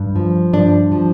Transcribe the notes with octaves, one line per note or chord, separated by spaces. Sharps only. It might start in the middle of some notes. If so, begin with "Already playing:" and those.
Already playing: G2
F3
G2 D4
F3